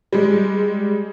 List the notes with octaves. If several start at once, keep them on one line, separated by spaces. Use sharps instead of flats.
G3 G#3